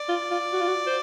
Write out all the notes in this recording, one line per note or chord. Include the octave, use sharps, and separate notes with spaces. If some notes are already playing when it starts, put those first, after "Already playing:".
Already playing: D5
F4
F4
F#4
F4
F#4
C5